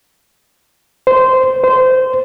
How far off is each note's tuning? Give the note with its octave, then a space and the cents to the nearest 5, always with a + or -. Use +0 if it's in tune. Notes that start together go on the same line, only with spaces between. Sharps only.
C5 -15
C5 -20